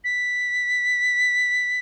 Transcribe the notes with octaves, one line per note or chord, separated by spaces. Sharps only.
B6